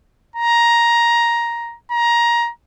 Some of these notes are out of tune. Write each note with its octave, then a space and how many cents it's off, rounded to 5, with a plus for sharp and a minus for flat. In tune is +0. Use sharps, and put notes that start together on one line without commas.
A#5 +10
A#5 +20